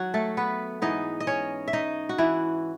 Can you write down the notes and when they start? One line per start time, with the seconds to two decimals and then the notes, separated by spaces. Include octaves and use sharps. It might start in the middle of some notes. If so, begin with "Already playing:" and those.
Already playing: D#3 F#3 F#4
0.14 A3 A4
0.37 B3 B4
0.82 G#2 E3 B3 D#4 D#5
1.20 D#5
1.27 C#4 C#5
1.68 E5
1.73 D#4 D#5
2.09 F#4
2.18 E3 E4